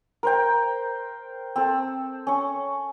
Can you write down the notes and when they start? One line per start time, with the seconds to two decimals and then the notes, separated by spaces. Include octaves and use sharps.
0.23 A#4 C5 G5
1.56 C4 A4
2.27 C#4 C#6